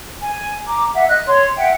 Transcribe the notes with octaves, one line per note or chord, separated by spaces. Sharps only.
G#5
A#5 D6
E5 F#5
D#5 F#6
C#5 C6
E5 F#5 G5